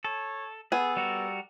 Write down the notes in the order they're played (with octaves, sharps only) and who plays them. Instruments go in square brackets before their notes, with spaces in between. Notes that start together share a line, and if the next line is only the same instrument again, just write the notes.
[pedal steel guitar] A4 [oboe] C#5
[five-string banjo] B3 G#5 [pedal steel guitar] G#4 [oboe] A4
[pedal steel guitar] G3 F#4 A#4